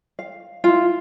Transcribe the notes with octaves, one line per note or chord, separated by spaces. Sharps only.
F5
E4 F4